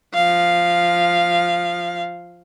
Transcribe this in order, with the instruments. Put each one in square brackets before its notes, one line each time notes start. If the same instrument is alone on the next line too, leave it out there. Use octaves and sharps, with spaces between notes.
[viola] F3 F5